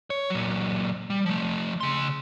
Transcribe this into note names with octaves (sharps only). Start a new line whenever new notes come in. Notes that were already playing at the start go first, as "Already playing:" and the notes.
C#5
A#2 F#3
G3
F3 A3
C#3 C6